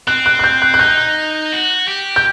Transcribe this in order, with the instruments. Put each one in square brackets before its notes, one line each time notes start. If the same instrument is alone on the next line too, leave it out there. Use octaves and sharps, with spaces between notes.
[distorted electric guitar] C4 [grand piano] F#6
[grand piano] F#6
F#6
G6
F#6
F#6
[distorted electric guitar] D#4 [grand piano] G6
[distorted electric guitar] F#4
G4
[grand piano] G6